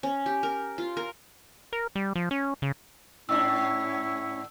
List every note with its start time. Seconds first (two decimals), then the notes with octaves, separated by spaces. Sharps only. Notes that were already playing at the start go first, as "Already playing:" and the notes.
0.03 C#4
0.26 G4
0.43 A#4
0.78 F4
0.97 A#4
1.73 A#4
1.95 G3
2.15 F3
2.31 C#4
2.62 C#3
3.29 G#2 C#4 D4 E4 C#6 E6